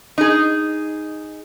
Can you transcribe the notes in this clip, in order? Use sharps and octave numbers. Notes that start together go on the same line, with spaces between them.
D#4 G#4